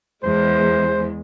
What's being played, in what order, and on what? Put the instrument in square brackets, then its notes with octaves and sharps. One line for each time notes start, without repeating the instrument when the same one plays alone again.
[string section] E2 G#3 [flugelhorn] C5